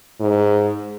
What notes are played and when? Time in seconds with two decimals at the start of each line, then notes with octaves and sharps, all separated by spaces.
0.20 G#2